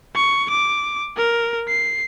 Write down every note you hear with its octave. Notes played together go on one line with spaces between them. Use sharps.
C#6
D6
A#4
C7